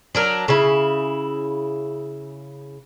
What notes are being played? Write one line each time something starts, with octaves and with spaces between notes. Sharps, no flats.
F#3 D4 A#4
C#3 E4